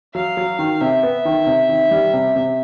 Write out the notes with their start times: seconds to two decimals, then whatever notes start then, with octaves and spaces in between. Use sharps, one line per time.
0.14 F#3 F5
0.37 F#3
0.59 D#3
0.80 C3 E5
1.03 B3
1.25 D#3
1.47 C3
1.69 D#3
1.91 G3
2.14 C3
2.36 C3